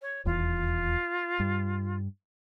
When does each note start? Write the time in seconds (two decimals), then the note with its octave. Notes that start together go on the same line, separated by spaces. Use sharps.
0.02 C#5
0.25 D#1 E2 F4
1.40 G2